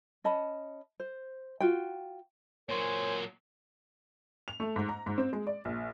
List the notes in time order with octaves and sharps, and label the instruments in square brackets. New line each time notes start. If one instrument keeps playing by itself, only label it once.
[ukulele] C#4 D#5 A5 B5
C5
F4 F#4 G5
[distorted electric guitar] A#2 F#3 [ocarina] A#4 [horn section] C5 C#5 G#5
[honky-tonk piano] F7
A3
G#2
A#5
G#2
C4
G#3
D5
A#1